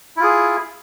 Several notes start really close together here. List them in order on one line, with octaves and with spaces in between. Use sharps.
E4 F4 G#4